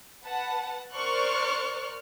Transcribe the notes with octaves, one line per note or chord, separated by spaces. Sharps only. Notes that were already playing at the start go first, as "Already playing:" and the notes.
B4 F#5 A5
A#4 C5 D5 C#6 F6 F#6